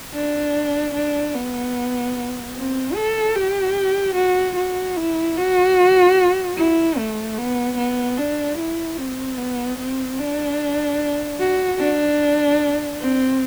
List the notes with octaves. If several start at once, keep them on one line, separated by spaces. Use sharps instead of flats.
D4
D4
B3
C4
A4
G4
F#4
F#4
E4
F#4
E4
A3
B3
B3
D4
E4
C4
B3
C4
D4
F#4
D4
C4